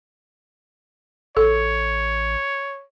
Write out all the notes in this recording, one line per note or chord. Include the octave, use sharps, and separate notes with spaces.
A1 A4 C#5